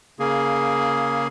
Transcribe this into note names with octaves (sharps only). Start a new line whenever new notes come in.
C#3 A#3 G#4